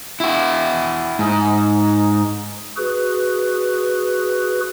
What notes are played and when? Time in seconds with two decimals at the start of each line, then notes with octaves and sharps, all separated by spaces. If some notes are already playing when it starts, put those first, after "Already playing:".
0.20 E4 F#4
1.19 G#2
2.77 F#4 G#4 B4